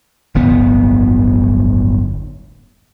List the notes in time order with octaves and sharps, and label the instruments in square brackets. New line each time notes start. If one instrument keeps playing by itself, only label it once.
[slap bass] D1 G1 F2 B3